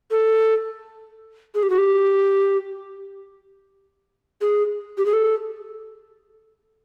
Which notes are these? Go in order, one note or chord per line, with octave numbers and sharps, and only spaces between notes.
A4
G#4
G4
F#4
G4
G#4
G4
G#4
A4